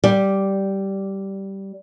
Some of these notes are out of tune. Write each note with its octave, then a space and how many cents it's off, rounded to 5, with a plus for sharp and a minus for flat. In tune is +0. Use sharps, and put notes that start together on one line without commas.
G3 -10